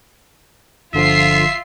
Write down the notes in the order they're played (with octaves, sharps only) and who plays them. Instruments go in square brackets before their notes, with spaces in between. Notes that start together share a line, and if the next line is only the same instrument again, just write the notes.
[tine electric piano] G1 D3 F3 [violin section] F4 C7 [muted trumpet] E5